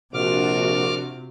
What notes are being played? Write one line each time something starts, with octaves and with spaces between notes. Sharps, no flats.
A#1 C3 D4 F4 F#4 D6 F6